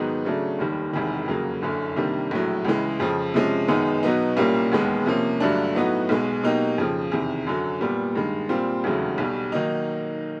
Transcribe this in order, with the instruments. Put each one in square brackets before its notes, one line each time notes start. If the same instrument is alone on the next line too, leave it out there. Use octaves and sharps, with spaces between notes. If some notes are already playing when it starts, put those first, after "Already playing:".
Already playing: [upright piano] G#2 D#3 F#3 B3 D#4
C#3 F#3 A3 D4
F1 D#2 D#3 G3
E1 E2 C3 D#3
F2 C#3 F#3 A#3
F#1 F#2 D3
C3 D#3 G3 A#3 D4
A#1 A2 F#3
C#2 C#3 E3 G#3
F2 C#3 F3
C3 F3 G#3 C#4
F#2 D#3 G#3 B3 D#4
B2 F#3 B3 D#4
C2 A#2 G3 A#3 C#4
E1 D#2 D#3 G#3 B3
C3 F3 A#3 C#4
G2 D3 F#3 A3 D4
A2 F#3 B3 D#4 F#4
B1 B2 G#3
B2 F#3 A#3 D#4 G4
F2 C#3 F3
E2 C3 D#3
F#2 D3 F#3
A#2 G3 B3
G2 D#3 G#3
A#2 G3 C4 F4
E1 D#2 C#3 F#3 A3
B1 B2 G3
D#3 F#3 A#3 D#4